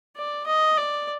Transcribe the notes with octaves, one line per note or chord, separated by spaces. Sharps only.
D5
D#5
D5